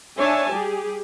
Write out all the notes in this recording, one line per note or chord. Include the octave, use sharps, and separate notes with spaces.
D4 C#5 E5 G#5 A5
G3 G4 G#4